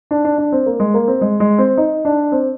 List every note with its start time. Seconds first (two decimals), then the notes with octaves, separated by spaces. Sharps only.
0.11 D4
0.24 D4
0.38 D4
0.52 C4
0.66 A#3
0.80 G#3
0.94 A#3
1.08 C4
1.21 G#3
1.40 G#3
1.58 C4
1.78 D#4
2.05 D4
2.32 C4